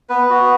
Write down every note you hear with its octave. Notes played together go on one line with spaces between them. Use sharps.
B3 B4
B3 F#4